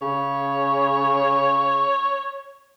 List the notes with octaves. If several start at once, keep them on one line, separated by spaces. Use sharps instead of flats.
C#3 C#5